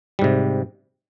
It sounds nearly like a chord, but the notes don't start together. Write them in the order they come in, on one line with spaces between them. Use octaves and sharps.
G3 G#2 C3